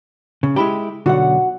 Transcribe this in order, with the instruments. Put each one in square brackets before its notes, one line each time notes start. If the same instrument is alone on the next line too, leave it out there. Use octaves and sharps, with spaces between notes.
[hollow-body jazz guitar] C#3
[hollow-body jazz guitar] G#3 E4 G4 [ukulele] B5
[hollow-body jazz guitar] B1 D3 [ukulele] F#4 F#5